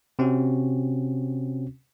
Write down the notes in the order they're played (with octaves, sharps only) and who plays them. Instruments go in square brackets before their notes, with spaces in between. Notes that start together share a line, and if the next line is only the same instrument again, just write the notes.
[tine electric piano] C3 C4 C#4 F#4